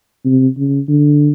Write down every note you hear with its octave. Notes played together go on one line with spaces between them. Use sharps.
C3
C#3
D3